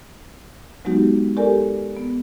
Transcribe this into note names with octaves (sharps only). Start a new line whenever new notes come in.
F#3 G#3 B3 D#4 F#4 G4
G4 A4 A#4 D5 G#5
B3